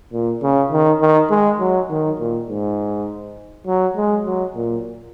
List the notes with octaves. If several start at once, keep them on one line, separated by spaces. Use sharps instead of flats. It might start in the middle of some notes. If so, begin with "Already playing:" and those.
A#2
C#3
D#3
D#3
G#3
F#3
D#3
A#2
G#2
F#3
G#3
F#3
A#2